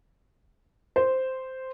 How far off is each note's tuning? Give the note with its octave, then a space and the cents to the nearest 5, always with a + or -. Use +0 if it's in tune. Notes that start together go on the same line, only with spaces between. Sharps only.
C5 -5